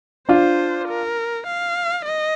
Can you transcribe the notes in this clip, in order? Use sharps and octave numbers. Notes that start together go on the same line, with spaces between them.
D4 F4 C5
A#4
F5
D#5